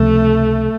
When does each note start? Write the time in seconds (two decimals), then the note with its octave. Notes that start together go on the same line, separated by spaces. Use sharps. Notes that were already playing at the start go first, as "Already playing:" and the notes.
Already playing: C#2 C3 F3 A3